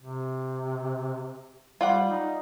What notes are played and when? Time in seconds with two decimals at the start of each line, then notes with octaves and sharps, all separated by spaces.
0.01 C3
1.81 G3 F4 D5 F#5
2.11 D#4